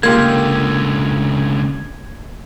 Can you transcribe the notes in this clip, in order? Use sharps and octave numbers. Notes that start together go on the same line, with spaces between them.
C#2 D3 A#3 F4 G4 G#6